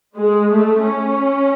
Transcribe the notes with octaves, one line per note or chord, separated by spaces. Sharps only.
G#3
A3
C#4